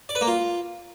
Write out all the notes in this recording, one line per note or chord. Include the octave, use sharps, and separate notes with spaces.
D5
B4
A#3
F4